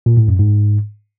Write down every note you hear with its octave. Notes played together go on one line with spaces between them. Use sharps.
A#2
A2
F#2
G#2